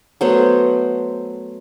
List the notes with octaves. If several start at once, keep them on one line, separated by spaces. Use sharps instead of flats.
F#3 A3 B3 C5